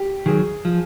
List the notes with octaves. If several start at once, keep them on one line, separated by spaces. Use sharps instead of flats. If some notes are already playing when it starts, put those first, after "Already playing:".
Already playing: G4
D#3 F#3 G#4
F3